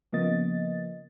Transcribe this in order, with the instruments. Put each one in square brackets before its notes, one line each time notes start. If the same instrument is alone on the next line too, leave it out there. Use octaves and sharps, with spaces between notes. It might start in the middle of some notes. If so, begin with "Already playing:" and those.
[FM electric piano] C#3 F3 A#3 B3 D#5 A6